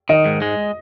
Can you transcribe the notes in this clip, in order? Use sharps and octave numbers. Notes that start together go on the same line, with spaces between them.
D#3 D#5
G#2
G#3